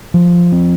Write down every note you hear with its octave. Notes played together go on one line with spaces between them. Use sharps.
F3
C4